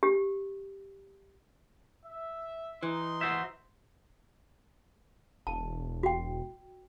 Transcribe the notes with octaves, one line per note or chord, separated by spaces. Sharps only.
G4
E5
E3 D#4 C6
F#4 C5 E5
E1 A5
F#4 G5